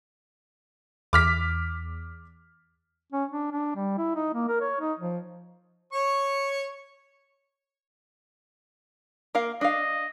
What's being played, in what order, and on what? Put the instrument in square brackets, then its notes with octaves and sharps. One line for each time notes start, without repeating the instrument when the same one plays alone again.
[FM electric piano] E2 [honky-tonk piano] D6 F6 B6
[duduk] C#4
D4
D4
G3
E4
D#4
A#3
A#4
C#5
D#4
F3
[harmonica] C#5 C#6
[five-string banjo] A#3 A#4 F5
[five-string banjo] D4 F5 [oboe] D#5